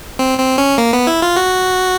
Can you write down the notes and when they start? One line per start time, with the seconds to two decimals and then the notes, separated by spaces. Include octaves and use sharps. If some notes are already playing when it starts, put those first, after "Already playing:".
0.19 C4
0.38 C4
0.58 C#4
0.78 A#3
0.93 B3
1.07 E4
1.22 F4
1.36 F#4